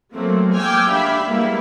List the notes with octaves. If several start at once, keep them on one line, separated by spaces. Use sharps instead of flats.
F#3 A3 A#3 C4
G5 G#5 D6 E6 F6
D4 G4 E5 F5 B5
G3 G#3 A#3 B3 E4